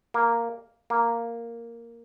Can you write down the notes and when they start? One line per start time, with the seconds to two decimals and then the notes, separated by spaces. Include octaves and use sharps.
0.14 A#3
0.90 A#3